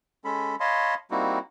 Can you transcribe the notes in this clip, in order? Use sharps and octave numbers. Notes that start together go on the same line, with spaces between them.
G#3 C#4 A4 B5
C#5 D#5 F5 A5 B5 C6
G3 A#3 C4 D#4 E4 F#4